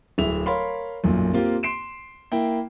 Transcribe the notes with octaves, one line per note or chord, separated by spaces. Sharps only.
D1 E4 G#4 E5 F7
A#4 C#5 F5 B5 C6
B1 F#2 A#2
A#3 C4 F4 G4
C6 C7 D7 E7
A#3 E4 G5